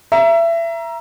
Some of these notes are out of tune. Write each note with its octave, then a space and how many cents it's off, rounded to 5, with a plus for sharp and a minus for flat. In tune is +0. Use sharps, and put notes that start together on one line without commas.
E5 +25 A#5 +15